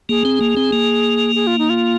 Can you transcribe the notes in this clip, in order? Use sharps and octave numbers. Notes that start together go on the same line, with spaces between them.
A#3 G#4
C4
A#3
C4
A#3
G#4
F4
D#4
F4